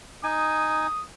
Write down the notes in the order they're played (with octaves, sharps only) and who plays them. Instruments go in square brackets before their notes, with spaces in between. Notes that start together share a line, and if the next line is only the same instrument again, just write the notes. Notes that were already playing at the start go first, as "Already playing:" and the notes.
[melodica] D#4 G#5 [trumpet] D#6